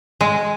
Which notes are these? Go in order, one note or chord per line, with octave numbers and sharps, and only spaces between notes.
G#3